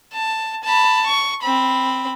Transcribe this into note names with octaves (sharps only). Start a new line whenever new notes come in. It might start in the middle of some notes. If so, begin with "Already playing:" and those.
A5
A5 B5
C#6
C4 B5